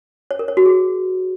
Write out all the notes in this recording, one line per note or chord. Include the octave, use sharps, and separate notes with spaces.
C#5
A#4
C#5
F#4
G#4